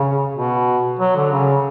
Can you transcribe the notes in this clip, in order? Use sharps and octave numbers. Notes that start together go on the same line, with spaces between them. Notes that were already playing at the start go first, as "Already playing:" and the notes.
Already playing: C#3
B2
F#3
D3
C#3